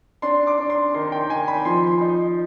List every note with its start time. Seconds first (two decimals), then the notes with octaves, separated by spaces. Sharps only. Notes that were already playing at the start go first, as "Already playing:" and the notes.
0.22 D4 C6
0.47 D6
0.58 D4
0.70 C6
0.94 D#3 C6
1.12 G5
1.29 D#3 G#5
1.48 B5
1.65 F3 C6
2.01 D#4